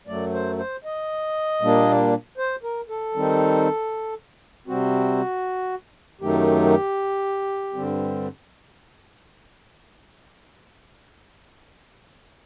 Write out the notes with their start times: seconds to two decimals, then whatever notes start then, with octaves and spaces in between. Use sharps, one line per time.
0.07 F#2 F#3 A3 D5
0.33 C5
0.59 C5
0.84 D#5
1.61 A#2 G3 A#3 D4
2.38 C5
2.63 A#4
2.89 A4
3.15 D#3 G3 C4 D#4
4.67 C3 G3 C4 F#4
6.21 F#2 D#3 F#3 A3 D#4 G4
7.74 G2 D3 G3 C4